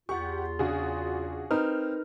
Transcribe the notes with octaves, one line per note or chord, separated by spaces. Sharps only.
E2 F4 G4 F#5 C#6
C#3 D4 F#4 G#4
C4 D#4 A#4 B4 F6